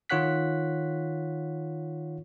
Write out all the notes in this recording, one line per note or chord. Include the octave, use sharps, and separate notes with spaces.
D#3 F4 C#5 F#5 F#6 B6